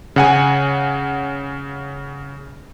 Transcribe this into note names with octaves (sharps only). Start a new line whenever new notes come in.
C#3 F#5 G#5